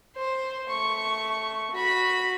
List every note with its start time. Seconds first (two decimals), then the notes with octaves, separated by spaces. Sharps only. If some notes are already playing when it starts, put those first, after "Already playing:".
0.16 C5
0.67 A3 C#6
1.71 F#4 B5